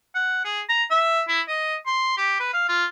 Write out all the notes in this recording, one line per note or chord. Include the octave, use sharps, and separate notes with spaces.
F#5
G#4
A#5
E5
E4
D#5
C6
G4
B4
F5
F4